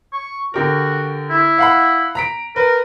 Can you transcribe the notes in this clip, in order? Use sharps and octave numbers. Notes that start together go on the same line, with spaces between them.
C#6
D3 F#4 G4 A#4
E4
F5 F#5 B5
A#5 B6 D7
A#4 B4